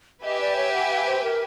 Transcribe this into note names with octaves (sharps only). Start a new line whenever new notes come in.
G4 B4 D#5 E5 G#5
D5
C#5
F#5
F5
C5
A#4